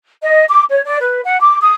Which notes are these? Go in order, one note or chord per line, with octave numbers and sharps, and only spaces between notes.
D#5
D6
C#5
D5
B4
F#5
D6
D#6